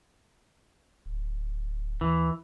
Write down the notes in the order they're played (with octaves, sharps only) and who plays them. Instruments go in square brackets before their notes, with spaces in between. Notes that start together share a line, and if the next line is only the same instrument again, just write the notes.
[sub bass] D1
[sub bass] D#2 [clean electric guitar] E3